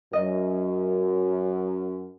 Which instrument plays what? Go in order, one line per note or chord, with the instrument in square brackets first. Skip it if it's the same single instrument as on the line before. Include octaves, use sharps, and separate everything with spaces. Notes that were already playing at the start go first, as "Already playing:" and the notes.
[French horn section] F#2 [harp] D#5